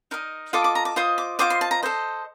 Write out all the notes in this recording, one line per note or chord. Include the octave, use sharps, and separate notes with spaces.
D#4 A#4 D#5
F4 A4 D#5 D6
D6
A#5
D6
F4 C5 D#5 D#6
D6
F4 C5 D#5 D6
C6
A5
A#5
A4 C5 D#5